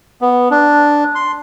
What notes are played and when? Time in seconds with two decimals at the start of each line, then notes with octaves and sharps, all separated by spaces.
0.21 B3
0.51 D4
1.15 C6